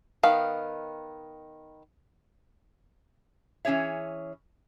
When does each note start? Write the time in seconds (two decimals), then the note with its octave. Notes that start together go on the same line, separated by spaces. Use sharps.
0.23 D#3 B3 F5
3.65 E3 C#4 G#4 C#5 E5